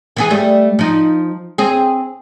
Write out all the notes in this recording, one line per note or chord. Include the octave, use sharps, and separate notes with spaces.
E3 B3 G#4
G3 A3
F3 D#4
C4 G#4